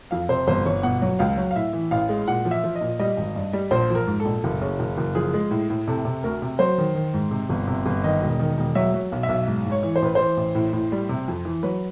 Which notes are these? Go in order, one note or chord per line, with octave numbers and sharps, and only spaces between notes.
F2 F5
C3 C5
G1 C5
G1 C#5
B2 F#5
F#3
C#2 F5
F#3
F5
A2 E5
E3
A1 F5
G#3
A#2 F#5
F3
E5
F3
D#5
A#2
G3 D#5
G#1
G2
G3
A#1 C5
F3
A#4
G#2
A4
A#1
F#1
C#3
F#1
F#1
F3 G#4
G#3
A2
A2
C3 A4
C3
D2 A#4
C3
F#3 C5
D#3
D#3
G#2
C3
G1
C3
G1
D#3 D#5
E1
D#3
E1
F#3 E5
F#3
B1
E5
B1
G#2
G#2
C#5
E3
C5
A1 B4
E3 C5
A1
A2
A2
G3
C3
F2
E3
F#3 B4